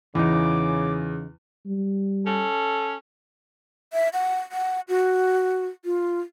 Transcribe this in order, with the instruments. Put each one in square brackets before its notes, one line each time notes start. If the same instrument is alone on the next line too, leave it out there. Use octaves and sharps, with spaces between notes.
[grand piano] E2 [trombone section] C#3 [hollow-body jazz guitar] E3 D#4 [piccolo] D6
[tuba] G3
[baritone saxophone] C#4 [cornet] A4
[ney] E5
F#5
F#5
F#4
F4